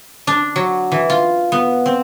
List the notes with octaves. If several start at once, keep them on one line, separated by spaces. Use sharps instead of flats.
D4
F#3
E3
F4
B3
C4